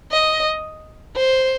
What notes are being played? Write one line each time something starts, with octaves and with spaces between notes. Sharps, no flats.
D#5
C5